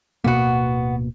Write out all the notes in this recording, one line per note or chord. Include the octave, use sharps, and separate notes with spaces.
D1 B2 A#3 B3 F#4